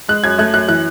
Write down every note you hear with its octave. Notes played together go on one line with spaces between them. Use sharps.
G#3 F#6
F#2 G#6
A3 F#6
F#2 F#6
E3 F#6